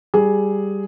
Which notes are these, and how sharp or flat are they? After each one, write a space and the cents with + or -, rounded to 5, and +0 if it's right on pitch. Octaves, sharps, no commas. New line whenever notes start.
G3 +0 G#4 +5